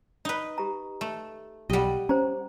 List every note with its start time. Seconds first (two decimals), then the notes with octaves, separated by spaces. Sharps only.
0.25 D#4 B4
0.58 G4 A#5
1.01 A3
1.70 B1 G3 G4 D#5 F#5
2.09 C#4 C5 A#5